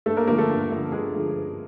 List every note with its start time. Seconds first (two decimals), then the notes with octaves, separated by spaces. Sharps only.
0.06 G2 A3 A4
0.17 A#3 A#4
0.27 D3 F3 A3 A#3 A#4
0.38 A3 A4
0.49 G2
0.71 D3 F3 A3
0.92 G2 G#3 G#4
1.14 D3 F3 A3
1.36 G2